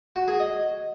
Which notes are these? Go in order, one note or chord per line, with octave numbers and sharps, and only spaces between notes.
F#4
G#4
D#5